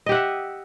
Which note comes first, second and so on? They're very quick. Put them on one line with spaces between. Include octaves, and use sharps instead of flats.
D#5 G4 F#5 E5